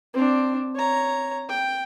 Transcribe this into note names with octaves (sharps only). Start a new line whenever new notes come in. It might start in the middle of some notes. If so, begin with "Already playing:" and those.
C4 D4
C#5 A#5
G5